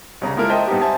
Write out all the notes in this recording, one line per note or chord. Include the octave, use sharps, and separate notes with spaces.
C2 C#3 A#5
G#3 A#3 E4 F4 A4 A#4
C5 D#5 E5 G5 A5 C6
G2 B3 C4 D#4 G4
C5 E5 G#5 A5